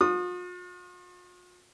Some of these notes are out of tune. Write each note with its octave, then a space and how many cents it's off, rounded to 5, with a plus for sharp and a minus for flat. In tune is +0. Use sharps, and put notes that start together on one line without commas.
F4 +45 D#6 -20